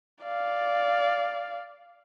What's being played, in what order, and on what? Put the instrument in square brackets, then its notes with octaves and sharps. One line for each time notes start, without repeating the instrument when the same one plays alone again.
[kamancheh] D5 F5